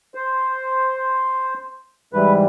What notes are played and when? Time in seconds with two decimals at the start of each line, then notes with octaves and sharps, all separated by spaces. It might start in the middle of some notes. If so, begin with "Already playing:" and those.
0.15 C5
2.13 G#2 E3 G3 B4